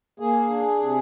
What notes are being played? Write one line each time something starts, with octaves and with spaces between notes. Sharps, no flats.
A#3 G#4
D4
C3